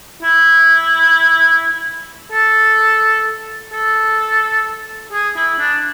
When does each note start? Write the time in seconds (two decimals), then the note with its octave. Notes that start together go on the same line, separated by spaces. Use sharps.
0.23 E4
2.32 A4
3.73 A4
5.13 G#4
5.36 E4
5.59 D4